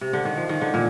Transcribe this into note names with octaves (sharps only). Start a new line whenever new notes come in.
C3
D3
D#3
F3
D#3
D3
A#2